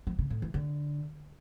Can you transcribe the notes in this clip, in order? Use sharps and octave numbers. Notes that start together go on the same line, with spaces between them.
F3
C#3
A2
E3
D3